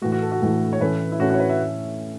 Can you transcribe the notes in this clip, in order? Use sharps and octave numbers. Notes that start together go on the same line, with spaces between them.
A2 E3 A3 F#4
F#4
A4
F#4
A2 E3 A3
C#5
A2 E3 C#4 A4 B4
E4
A2 E3 C#4 F#4 A4
F#4
C#5
B4
E5